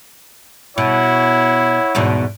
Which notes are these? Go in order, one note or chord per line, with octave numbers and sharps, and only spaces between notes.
B2 E4 C#5 F#5
E2 G#2 B2